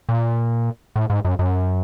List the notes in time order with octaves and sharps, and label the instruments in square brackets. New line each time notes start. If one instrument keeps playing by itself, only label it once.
[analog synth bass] A#2
A2
G#2
F#2
F#2